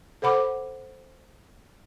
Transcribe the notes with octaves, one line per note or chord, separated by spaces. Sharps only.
A4 C5 F#5 B5 D6